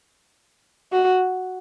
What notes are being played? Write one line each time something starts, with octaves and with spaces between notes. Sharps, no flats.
F#4